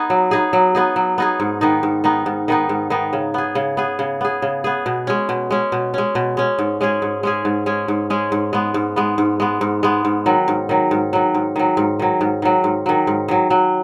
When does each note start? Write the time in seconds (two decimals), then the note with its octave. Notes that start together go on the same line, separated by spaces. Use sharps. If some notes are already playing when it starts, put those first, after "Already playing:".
Already playing: B3 D#4 G#4
0.10 F#3
0.31 B3 D#4 G#4
0.53 F#3
0.75 B3 D#4 G#4
0.96 F#3
1.18 B3 D#4 G#4
1.40 G#2
1.61 D#3 B3 D#4
1.83 G#2
2.04 D#3 B3 D#4
2.26 G#2
2.48 D#3 B3 D#4
2.69 G#2
2.90 D#3 B3 D#4
3.13 C#3
3.34 B3 G#4
3.55 C#3
3.77 B3 G#4
3.99 C#3
4.21 B3 G#4
4.42 C#3
4.64 B3 G#4
4.86 B2
5.07 G#3 C#4
5.29 B2
5.51 G#3 C#4
5.72 B2
5.94 G#3 C#4
6.15 B2
6.37 G#3 C#4
6.59 G#2
6.81 G#3 C#4 G#4
7.02 G#2
7.23 G#3 C#4 G#4
7.45 G#2
7.66 G#3 C#4 G#4
7.88 G#2
8.10 G#3 C#4 G#4
8.32 G#2
8.53 G#3 B3
8.74 G#2
8.96 G#3 B3
9.18 G#2
9.40 G#3 B3
9.61 G#2
9.83 G#3 B3
10.05 G#2
10.26 D#3 F#3
10.48 G#2
10.69 D#3 F#3
10.91 G#2
11.13 D#3 F#3
11.34 G#2
11.56 D#3 F#3
11.77 G#2
11.99 D#3 F#3
12.21 G#2
12.42 D#3 F#3
12.64 G#2
12.86 D#3 F#3
13.07 G#2
13.28 D#3 F#3
13.50 F#3